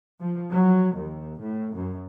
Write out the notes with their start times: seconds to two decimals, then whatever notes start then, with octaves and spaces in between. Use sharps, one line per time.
0.20 F3
0.52 F#3
0.96 D#2
1.39 A2
1.75 F#2